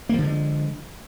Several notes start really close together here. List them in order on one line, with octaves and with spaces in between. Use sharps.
A#3 F3 D3 G#3